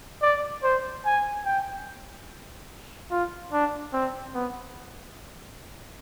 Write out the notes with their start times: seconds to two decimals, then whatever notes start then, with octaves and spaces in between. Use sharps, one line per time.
0.22 D5
0.64 C5
1.06 G#5
1.46 G5
3.11 F4
3.53 D4
3.93 C4
4.34 B3